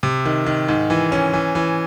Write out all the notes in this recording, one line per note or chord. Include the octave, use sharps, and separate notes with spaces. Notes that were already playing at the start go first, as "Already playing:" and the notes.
C3
D#3
D#3
G#2
E3
C#4
E3
E3